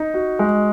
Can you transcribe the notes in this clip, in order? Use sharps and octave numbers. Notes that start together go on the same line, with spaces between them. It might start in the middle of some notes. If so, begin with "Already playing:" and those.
Already playing: D#4
F#4
G#3